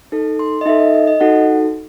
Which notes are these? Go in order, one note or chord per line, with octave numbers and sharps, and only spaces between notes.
D#4 A4
C6
D#5
D#4 A4 E5
D#5
D#5
D#5
D#4 F#4 A4 F#5